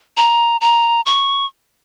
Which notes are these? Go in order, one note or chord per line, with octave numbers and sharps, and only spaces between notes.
A#5
A#5
C#6